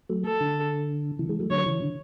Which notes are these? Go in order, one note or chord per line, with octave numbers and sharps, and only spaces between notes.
F#3 A3
A4
D3
C#3 E3
E3 G#3
F#3 A3
D3 F#3 C#5
C#3 E3
D3